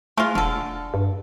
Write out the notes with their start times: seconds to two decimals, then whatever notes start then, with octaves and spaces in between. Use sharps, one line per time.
0.18 G#3 A3 F4
0.35 E1 D3 A4
0.94 G2